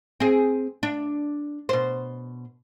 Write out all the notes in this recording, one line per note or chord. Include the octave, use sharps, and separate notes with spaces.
C4 G#4
D4
B2 C5